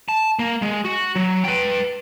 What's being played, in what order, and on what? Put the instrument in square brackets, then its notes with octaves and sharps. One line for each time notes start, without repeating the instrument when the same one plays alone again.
[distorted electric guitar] A5
A#3
G#3
F#4
F#3
B4 G5